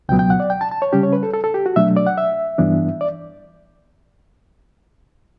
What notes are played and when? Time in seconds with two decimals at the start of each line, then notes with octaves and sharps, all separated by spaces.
0.09 C#2 B2 F#3 B3 G5
0.19 G5
0.30 F#5
0.40 D5
0.50 G5
0.61 A5
0.71 A5
0.82 C#5
0.93 C#3 G3 C#4 G4
1.03 C#5
1.13 B4
1.23 A4
1.33 A4
1.44 A4
1.54 G4
1.66 F#4
1.76 B2 F#3 A3 D4 E5
1.96 D5
2.07 F#5
2.18 E5
2.58 G2 E3 B3 D4
3.01 D5